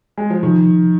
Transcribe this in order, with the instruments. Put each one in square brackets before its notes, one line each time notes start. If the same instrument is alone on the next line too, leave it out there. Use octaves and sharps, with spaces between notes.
[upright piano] G#3
F3
[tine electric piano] C3 F3 [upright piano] D#3